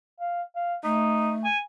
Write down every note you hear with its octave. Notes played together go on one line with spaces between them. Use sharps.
F5
F5
A3 D#4
G#5